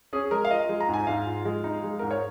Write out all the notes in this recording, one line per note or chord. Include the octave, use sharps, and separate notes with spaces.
C#4 G#4
G#3 A#4
F5
F4 D#5
G#3
A#5
G#2 G#5
G#2 F5
F4
G#3
D#4
G#3
G#2 A#4
C#5